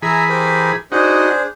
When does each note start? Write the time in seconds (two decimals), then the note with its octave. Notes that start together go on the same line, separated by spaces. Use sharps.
0.02 E3 G#4 E5 G#5 A#5 B5
0.29 G4 A#4 C5
0.92 D4 D#4 F#4 G#4 C5